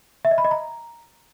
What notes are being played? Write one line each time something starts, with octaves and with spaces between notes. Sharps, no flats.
E5
D#5
B5
D#5
A#5